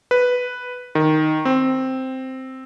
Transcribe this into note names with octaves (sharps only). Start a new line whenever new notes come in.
B4
D#3
C4